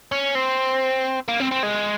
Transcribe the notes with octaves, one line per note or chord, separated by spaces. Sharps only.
C#4
C4
A#3
C4
C4
G#3